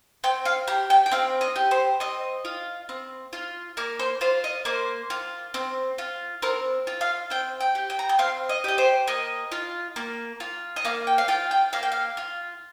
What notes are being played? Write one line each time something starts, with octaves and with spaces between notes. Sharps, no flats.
C4 G5
F5
G4 A#5
G5
G5
C4 F5
D#5
G4
C5
C4 D#5
F4
C4
F4
A#3 A#4
C5
F4 C5
D#5
A#3 C5
F4
C4
F4
C4 A#4
F4
F5
C4 G5
G5
G4
G5
A#5
G5
C4 F5
D#5
G4 D#5
C5
A#3 D#5
F4
A#3
F4
D#5
A#3 F5
G5
F5
F4 G5
G5
A#3 F5
G5
F5
F4